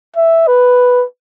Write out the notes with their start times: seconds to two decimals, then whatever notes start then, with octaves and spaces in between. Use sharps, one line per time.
0.16 E5
0.47 B4